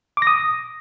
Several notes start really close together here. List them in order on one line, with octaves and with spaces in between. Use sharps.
D6 A#6 D#6